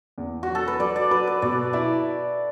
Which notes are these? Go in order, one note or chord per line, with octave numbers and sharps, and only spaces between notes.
E2
F#4
F#3
A4
B4
F#3 D5
D5
F#3 B4
B4
B2 D5
E4 D5